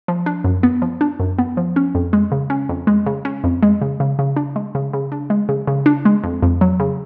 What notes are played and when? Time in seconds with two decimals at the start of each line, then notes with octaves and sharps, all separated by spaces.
0.08 F3
0.26 D4
0.44 F#2
0.63 B3
0.82 F3
1.01 D4
1.20 F#2
1.38 B3
1.57 F3
1.76 C#4
1.95 F2
2.13 G#3
2.32 C#3
2.50 C#4
2.69 F2
2.87 G#3
3.06 C#3
3.25 C#4
3.44 F2
3.63 G#3
3.82 C#3
4.00 C#3
4.19 C#3
4.36 D4
4.56 G#3
4.75 C#3
4.93 C#3
5.12 D4
5.30 G#3
5.49 C#3
5.67 C#3
5.86 D4
6.05 G#3
6.24 F2
6.43 F2
6.61 F#3
6.80 C#3